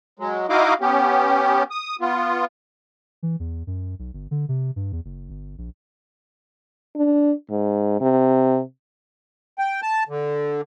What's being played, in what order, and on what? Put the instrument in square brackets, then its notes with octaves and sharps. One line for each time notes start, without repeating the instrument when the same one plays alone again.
[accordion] F#3 G#3
D#4 E4 F#4 D#5 F5 D6
B3 C#4 G4
D#6
B3 F4
[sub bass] E3
E2
F#2
B1
G1
D3
C3
G2
E2
F#1
G1
A#1
[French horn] D4
G#2
C3
[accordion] G5
A5
D3